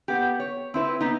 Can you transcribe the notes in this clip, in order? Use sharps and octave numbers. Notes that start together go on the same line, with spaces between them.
B3 G4
C#5
C4 E4 B4
B3 D#4